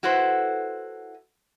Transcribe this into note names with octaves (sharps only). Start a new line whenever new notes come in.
E4 F#4 A4 B4 C5